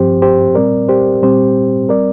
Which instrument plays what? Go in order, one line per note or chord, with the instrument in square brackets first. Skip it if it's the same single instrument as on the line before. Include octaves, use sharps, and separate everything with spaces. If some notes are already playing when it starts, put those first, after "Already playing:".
Already playing: [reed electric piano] G2 F3 C4 G4 C5
G4 C5
A#2 G3 C4 A#4 D5
G4 C5
A#2 G3 C4 G4 C5
G3 C4 A#4 D5